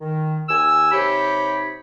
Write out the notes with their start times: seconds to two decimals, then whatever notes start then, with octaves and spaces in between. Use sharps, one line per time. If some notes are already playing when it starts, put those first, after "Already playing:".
0.01 D#3
0.49 D#2 G#5 E6
0.92 C3 D#4 G4 C#5 B5